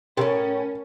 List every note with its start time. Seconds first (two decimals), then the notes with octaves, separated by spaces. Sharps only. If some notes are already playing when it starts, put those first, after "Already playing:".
0.17 A2 C3 C#4 A#4